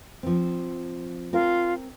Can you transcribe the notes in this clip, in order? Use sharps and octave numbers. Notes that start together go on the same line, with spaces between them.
F3 C4
C4 F4 A#4